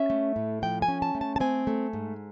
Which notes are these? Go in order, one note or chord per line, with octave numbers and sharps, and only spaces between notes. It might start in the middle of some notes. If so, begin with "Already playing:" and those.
Already playing: C#4 E5
A3
A2
F3 G5
G#5
C#4
A5
A3
A5
A5
C4 G#5
A3
G#2